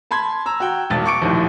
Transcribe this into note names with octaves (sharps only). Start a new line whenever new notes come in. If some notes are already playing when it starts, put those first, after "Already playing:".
A5 B5 C6 G#6
A#5 E6
F#4 G5
E1 B1 A6
C#6 D6 C#7 D7
A#1 D#2 A2